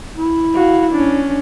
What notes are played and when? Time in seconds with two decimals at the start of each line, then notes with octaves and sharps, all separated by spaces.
0.18 E4
0.54 F#4 F5
0.92 C#4 D4